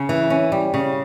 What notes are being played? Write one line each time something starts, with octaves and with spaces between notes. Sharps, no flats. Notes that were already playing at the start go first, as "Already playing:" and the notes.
Already playing: C#3
E3
C#4
G3
C#3